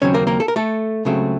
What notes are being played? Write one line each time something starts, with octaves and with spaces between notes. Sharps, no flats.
D#2 C#3 F#3 C4 C#4 C#5
A#3 A#4
A#3 A#4
A4
A#4
A3 A4
C#2 C#3 F#3 A3 C4